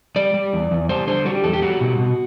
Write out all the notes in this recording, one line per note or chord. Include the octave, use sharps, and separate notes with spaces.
G3 D5
G3
E2
E2
G3 C5
D3 C5
G3 F#4
G4
E2 A4
G4
G3 F#4
B2
B2